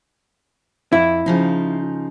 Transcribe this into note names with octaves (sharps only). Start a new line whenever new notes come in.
F2 E4
C#3 F3 D#4